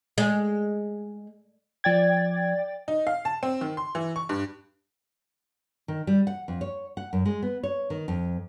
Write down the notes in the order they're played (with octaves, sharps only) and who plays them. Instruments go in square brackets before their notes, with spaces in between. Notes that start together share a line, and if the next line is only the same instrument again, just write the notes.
[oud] G#3
[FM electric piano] F3 G#6 [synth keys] D5 G5 A6
[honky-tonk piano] D#4
F5
A5
C4
D#3
C6
E3
C#6
G2
[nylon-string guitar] D#3
G3
F#5
F2
C#5
F#5
F#2
G#3
B3
C#5
D#3
F2